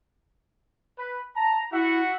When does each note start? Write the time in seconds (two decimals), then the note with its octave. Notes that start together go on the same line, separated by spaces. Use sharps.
0.97 B4
1.36 A5 A#5
1.71 E4 F#4 E5 F#5